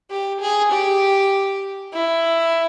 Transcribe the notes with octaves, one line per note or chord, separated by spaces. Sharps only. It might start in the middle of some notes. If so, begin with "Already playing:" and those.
G4
G#4
G4
E4